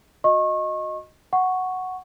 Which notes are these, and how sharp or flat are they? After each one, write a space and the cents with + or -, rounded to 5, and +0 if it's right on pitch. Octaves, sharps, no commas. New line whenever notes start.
F#4 -25 D#5 +0 C#6 -30
F#5 +0 C#6 +0